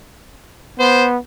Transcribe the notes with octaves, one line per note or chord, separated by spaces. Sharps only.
B3 C5